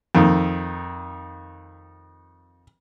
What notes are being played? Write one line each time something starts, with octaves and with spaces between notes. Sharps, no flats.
F2 D#3